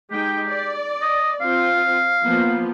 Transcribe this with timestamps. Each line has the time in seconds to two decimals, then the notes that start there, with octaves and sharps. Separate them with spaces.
0.11 G#3 D#4 G4 G5
0.49 D5
1.02 D#5
1.41 C4 F4 F5
2.24 F3 A#3 B3